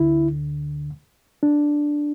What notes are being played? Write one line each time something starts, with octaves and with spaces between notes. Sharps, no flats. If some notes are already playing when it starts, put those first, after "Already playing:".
Already playing: D2 D3 E4
D4